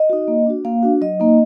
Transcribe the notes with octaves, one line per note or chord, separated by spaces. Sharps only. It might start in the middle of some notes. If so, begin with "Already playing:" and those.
Already playing: D#5
D#4 F#4
A#3
D4 F#4
A#3 F5
D4 F#4
F#3 D#5
A#3 D#4